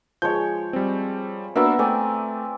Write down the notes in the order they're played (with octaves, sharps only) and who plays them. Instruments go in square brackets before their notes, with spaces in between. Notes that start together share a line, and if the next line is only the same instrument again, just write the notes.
[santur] F3 G#3 C#5 [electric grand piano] G6
[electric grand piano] G3 C4
[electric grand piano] A#3 D4 F#4 [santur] B3 A#4 E5
[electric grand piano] A3 [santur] C4 D5 G#5